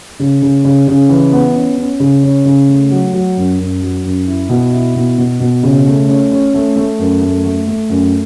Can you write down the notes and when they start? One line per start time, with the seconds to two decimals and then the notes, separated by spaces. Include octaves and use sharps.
0.19 C#3
0.42 C#3
0.65 C#3
0.87 C#3
1.09 E3
1.32 B3
1.54 C#4
1.78 C#4
2.00 C#3
2.23 C#4
2.45 C#3
2.69 A3
2.91 F#3
3.13 F#3
3.37 F#2
3.59 F#2
3.82 F#3
4.05 F#2
4.27 E4
4.49 B2
4.72 E4
4.95 B2
5.18 B2
5.40 B2
5.63 C#3
5.86 A3
6.09 C#4
6.32 C#4
6.54 A3
6.76 A3
6.99 F#2
7.21 A3
7.44 A3
7.67 A3
7.89 F#2